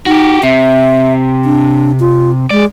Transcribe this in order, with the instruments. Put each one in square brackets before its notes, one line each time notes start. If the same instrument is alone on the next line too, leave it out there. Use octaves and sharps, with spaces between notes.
[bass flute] D#4 [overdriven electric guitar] F#4 G4
[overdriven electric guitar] C3 [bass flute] E5
[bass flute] D4
F4
[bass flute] G#3 [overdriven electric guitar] D5